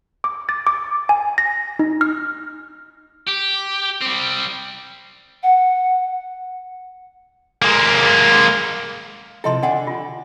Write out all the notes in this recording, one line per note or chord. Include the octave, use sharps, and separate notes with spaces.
D6
A6
D6
G#5
A#6
D#4
F6
G4
G3 C4
F#5
G#3 A#3
C3 F3 E4 A4 D#5 C6
D3 D4 D5 F#5 B5
F4